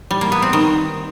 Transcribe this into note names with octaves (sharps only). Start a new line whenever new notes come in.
G3
A#3
B3
C4
D#3